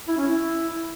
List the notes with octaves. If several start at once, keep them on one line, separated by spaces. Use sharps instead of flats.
E4
C#4
E4